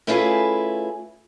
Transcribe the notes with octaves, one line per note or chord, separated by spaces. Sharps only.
A3 C#4 E4 F4 G#4 B4